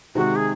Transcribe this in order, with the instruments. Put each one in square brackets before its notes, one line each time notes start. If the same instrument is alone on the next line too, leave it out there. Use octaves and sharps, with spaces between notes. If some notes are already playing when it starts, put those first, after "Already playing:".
[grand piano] C3 D#3 G#3 [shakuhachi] F#4
[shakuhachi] G#4